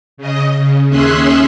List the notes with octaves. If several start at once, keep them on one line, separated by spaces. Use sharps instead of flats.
C#3 D#5
C#3
D#2 C#4 G#4 E5 C6 F#6